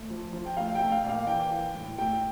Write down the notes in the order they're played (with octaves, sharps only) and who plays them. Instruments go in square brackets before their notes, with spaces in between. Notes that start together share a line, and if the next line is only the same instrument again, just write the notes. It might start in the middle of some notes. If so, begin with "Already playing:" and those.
Already playing: [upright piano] A3
F3
F3
G5
A3 F5
G5
A3
F5
A#2
F5
E3 G5
E3
A2
A3 G5